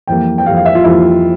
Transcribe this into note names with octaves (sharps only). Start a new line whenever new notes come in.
F2 E3 G3 A#3 G5
G5
F2 E3 G3 A#3 F5
F5
E5
F4
F2 E3 G3 A#3 E4